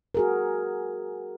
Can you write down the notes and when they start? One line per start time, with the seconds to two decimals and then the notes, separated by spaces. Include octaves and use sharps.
0.15 F#4 G#4 A#4